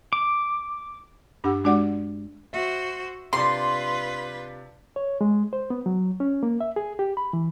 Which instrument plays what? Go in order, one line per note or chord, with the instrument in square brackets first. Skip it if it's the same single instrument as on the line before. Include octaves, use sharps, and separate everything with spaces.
[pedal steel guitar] D6
[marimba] G2 D4 G4 F#5 E6
G#3 D4 F#4 D5 F#5 D6
[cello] F#4 C5 [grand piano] E5
[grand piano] C3 D4 [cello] F4 B4 [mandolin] C6
[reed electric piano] C#5
G#3
C5
B3
F#3
C#4
A#3
E5
G#4
G4
B5
E3